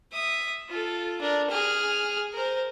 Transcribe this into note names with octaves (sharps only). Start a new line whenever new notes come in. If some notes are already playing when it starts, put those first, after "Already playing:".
E5 D#6
F4 A4
D4 A#4
G#4 F6
A#4 C5